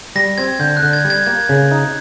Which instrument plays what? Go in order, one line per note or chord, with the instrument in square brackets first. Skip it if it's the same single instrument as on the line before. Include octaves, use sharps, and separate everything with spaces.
[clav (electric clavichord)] G3 [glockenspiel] A#6
[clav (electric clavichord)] C4 [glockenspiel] G#6
[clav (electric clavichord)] D3 [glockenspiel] G6
[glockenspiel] F#6
[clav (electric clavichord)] D3
[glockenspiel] G#6
[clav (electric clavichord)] G3
[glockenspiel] G#6
[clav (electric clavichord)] A#3 [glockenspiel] G#6
[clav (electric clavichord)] C#3
D#4